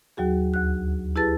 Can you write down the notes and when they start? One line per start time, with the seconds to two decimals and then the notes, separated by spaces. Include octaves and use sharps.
0.17 D#2 F#3 F#4 G#4
0.54 D2 F#6
1.16 E4 G4 G#4 B4 A5 A6